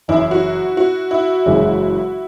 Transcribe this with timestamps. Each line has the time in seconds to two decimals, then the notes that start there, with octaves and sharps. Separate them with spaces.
0.08 F#1 F#2 E3 E4
0.31 F#4
0.77 F#4
1.11 E4
1.46 F#1 F#2 C#3 E3 G#3